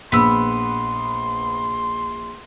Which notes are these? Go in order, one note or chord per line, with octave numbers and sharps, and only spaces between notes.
A#1 B3 C6 E6 B6